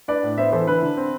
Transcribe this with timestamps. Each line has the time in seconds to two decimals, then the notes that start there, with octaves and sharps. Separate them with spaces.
0.08 D4 B4 D5
0.23 A2
0.38 B3 C5 E5
0.53 E3 A4 C5
0.67 D3 B4
0.83 D3
0.97 C4